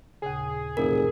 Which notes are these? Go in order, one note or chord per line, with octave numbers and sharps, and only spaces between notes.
D#2 A#2 C#3 G#4
F1 G2 B2 E3 A#4